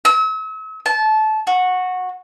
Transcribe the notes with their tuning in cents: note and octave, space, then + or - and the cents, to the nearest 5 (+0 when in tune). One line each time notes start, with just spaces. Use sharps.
E6 -40
A5 -20
F#4 -15